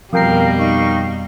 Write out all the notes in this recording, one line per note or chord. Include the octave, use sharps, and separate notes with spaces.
F2 B2 G3 A#4 F5 G5 C7
D#4 F5 C#6